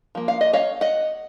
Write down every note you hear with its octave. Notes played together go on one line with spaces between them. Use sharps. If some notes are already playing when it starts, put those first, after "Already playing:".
F3 A#3
F5
D#5
C#5 F5
D#5 F#5